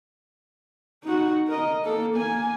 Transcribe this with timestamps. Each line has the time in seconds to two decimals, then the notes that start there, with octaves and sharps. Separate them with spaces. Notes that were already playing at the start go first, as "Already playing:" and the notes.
1.04 D#4 F#4
1.48 A#4 D#5
1.83 A#3 A4
2.16 A#3 G#5